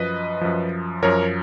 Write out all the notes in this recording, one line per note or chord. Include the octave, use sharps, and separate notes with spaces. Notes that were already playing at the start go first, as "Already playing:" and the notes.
Already playing: F#2 F3 B4 D#5
F#2 F3
F#2 F3 A#4 C#5